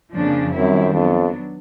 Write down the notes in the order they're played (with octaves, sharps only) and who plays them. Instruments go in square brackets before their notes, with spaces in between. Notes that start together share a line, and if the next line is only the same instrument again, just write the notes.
[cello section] F2 C#3 F3 A#3 D4
[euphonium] F#2 [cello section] D#3 G3 C4 E4
[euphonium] F2 [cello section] F#3 B3 D4